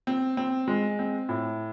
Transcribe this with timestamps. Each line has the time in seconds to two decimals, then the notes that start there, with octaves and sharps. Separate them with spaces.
0.07 C4
0.37 C4
0.68 G#3
0.99 C4
1.29 A2